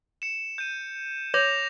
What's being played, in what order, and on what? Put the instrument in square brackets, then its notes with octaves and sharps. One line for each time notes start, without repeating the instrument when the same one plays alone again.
[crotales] C#7 E7
G6 D#7
[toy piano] C#5 [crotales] D6 A#6 F7